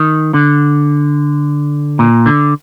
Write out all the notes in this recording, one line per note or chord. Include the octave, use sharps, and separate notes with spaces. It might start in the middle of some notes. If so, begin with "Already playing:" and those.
Already playing: D#3
D3
A#2
D3